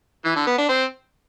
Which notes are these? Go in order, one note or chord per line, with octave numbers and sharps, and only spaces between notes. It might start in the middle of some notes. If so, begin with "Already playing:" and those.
E3
D3
B3
D4
C4